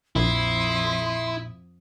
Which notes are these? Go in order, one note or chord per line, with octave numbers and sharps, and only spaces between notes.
A#1 F2 E4 C6 D#6